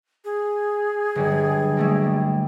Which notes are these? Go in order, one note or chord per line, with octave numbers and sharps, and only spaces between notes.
G#4
G1 F#3 G3
G3 A3 A#3